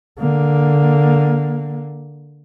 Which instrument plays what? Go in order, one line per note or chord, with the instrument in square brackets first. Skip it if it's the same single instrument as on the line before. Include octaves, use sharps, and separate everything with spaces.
[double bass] D3 A#3